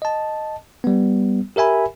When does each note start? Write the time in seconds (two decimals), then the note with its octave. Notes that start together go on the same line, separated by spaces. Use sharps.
0.02 D#5 A5
0.84 G3 B3
1.56 G4 A#4 E5 G#5 B5